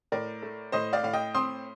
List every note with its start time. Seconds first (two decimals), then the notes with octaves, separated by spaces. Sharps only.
0.12 A2 A#4 D5
0.42 A3
0.72 A2 C5 D#5
0.93 D5 F5
1.03 A2 F5
1.13 D#5 G5
1.34 C4 C6 D#6